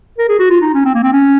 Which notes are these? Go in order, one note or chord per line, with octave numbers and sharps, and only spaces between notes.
A#4
G#4
F#4
F4
D#4
C#4
C4
A#3
C4
C#4